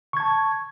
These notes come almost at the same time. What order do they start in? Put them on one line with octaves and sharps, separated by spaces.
C#6 G#6 A5